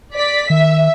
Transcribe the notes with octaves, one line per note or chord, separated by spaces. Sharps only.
D5 B6
D#3 E5